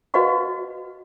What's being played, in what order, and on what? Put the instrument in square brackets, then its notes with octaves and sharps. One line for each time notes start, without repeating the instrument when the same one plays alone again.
[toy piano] F#4 B4 D#5 F5 F#5 C#6